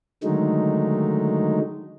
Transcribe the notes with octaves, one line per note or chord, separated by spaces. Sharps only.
D3 D#3 F#3 G#3 A3 D#4